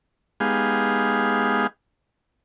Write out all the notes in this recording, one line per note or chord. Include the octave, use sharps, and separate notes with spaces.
G#3 B3 D#4 G4 G#4 F5